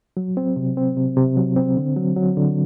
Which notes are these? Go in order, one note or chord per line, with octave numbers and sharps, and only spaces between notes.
F#3
C4
C3
C4
C3
C3
F#3
C4
D3
F#3
F#3
D3